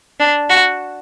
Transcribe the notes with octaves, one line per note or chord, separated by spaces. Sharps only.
D4
F#4